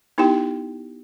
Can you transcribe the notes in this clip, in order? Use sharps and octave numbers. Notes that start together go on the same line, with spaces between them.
B3 D#4 E4 G4 G5